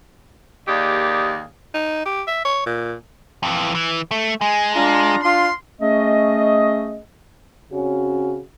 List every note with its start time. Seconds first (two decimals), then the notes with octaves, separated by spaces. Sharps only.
0.68 D#2 A#3 G4 G#4 D5 D#5
1.74 D#4
2.05 G4
2.27 E5
2.45 C#5
2.66 A#2
3.43 F2 E3
3.75 E3
4.11 A3
4.41 G#3 G#5
4.74 D4 F4 A#5
5.23 D4 F4 C6
5.81 A3 C#4 G#4 D#5
7.71 C#3 C4 C#4 F#4